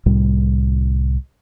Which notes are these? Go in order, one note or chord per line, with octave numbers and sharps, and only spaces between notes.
C2 A2 C3 G3